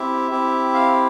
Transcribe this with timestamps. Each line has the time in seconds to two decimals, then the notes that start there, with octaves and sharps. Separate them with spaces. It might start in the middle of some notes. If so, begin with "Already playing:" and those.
Already playing: C4 E4 G4 E5
0.31 C4 E4 G4
0.74 F5